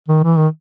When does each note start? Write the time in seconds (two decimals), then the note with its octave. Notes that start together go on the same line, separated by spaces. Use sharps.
0.08 D#3
0.24 E3
0.37 D#3